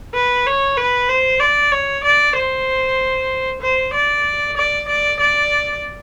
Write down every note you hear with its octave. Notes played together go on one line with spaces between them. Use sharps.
B4
C#5
B4
C5
D5
C#5
D5
C5
C5
D5
D5
D5
D5